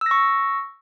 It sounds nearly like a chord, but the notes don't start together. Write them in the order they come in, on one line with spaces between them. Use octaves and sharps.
E6 A#6 C#6